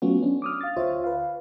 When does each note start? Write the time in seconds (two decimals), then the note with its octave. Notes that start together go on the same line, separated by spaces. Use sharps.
0.02 F#3 A3 B3 C#4 F4 F#4
0.23 C#4 D4
0.42 D6 D#6 F6
0.61 F5 A6
0.76 D2 F4 C5 C#5 E5
1.04 B4 F5